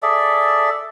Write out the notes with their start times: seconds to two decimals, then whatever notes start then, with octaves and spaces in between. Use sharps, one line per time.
0.03 G#4 A4 D5 E5